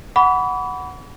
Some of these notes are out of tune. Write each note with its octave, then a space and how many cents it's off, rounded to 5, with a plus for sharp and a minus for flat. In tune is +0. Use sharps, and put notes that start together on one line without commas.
F#5 +0 B5 +0 D6 -45